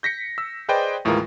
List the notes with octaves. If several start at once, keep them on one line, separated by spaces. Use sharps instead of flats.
G6 A#6 B6 C#7
E6
G#4 B4 C5 D5 D#5 G5
D#2 A2 E3 G#3 F4 A#4